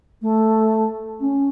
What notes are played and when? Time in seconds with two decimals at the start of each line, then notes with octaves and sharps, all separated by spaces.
0.22 A3
1.20 C#4